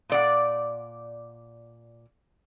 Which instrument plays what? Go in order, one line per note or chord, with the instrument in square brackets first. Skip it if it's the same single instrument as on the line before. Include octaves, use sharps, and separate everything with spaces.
[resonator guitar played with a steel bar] A#2 D5 F#5